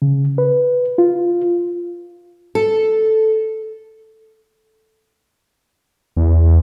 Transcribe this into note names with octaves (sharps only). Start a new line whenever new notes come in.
C#3
B4
F4
A4
E2